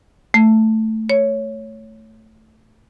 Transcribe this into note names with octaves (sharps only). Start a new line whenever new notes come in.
A3
C#5